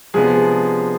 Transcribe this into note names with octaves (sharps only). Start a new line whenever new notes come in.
C3 F3 G#3 B3 D4 G#4